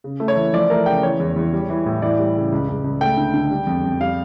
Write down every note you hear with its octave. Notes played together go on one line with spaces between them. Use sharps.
C#3
A3
C#5
E3
F3 D5
A3 A#4
C#3 G5
E3 C#5
E2
E2
G3
E3
A2
E3 D5
G3
C#3
C#2
C#2
C#2
A3 G5
D3
D3
G3
F2
F2
G3 F5